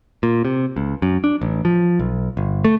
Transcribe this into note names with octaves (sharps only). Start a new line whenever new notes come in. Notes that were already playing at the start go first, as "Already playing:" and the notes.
A#2
C3
C#2
F#2
D4
A1
F3
B1
G1
A3